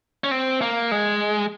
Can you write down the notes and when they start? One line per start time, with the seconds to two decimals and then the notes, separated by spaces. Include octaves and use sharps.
0.24 C#4
0.31 C4
0.62 A#3
0.91 G#3